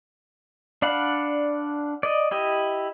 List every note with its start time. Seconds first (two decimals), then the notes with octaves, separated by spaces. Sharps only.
0.82 D4 D5 F5 F#5 B5
2.03 D5 D#5
2.31 E4 G4 D#5